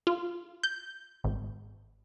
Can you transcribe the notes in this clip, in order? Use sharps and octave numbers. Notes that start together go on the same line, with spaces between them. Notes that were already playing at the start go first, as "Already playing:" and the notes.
F4
G6
G#1